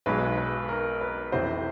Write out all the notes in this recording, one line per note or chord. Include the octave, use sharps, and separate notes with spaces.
B1 B2 G#3 B4
B4
A#4
B4
F1 F2 C3 E3 C5